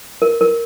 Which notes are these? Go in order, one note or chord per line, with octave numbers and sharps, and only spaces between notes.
A#4
A#4